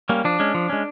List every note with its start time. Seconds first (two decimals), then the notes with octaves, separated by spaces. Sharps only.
0.09 G3 A#3 C#4
0.25 F3 D4
0.40 G#3 C#4
0.54 F3
0.69 G#3 C#4